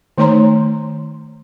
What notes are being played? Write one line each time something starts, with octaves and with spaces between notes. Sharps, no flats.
D#3 A3 D#4 C#5 A#5 C6